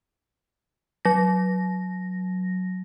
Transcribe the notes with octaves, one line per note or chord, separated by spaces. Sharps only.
F#3 A#6